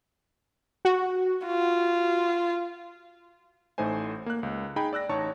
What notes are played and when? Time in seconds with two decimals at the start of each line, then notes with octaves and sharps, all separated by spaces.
0.85 F#4
1.45 F4
3.78 A1 A2 A3 D#4 C5 G#5
4.26 A#3 F#6
4.43 C#2
4.76 D#4 G#4 G5 B5
4.93 D5 E6 F#6 A#6
5.09 A1 D#4 C#5 A5 C#6